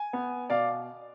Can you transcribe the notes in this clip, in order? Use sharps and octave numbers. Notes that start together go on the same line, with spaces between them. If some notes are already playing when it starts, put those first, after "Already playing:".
Already playing: G#5
B3
B2 D5 F5